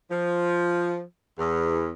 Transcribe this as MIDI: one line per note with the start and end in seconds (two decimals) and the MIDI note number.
0.11 1.02 53
1.39 1.90 40